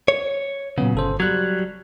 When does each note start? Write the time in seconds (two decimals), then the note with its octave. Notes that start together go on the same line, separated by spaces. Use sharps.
0.08 C#5
0.78 A#2 C#3 F#3 B3
0.95 G1 A4 C5
1.20 F#3 G3 F#6 G#6